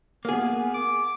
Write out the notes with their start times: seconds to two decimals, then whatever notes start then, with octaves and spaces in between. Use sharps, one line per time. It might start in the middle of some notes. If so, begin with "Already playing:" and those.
0.25 A#3 B3 G#4
0.74 D6